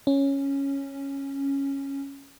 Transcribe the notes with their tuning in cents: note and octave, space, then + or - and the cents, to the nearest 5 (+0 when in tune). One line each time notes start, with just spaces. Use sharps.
C#4 -5